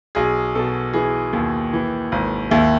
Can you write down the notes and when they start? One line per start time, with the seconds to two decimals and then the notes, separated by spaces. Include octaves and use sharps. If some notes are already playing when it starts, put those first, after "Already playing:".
0.15 B1 G#4
0.55 B2 A4
0.93 E3 G#4
1.33 D#2
1.73 E3
2.12 G#1
2.51 D#2 E4